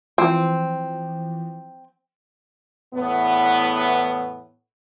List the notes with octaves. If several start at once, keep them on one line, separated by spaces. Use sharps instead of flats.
E3 F3 C4
E2 A2 B3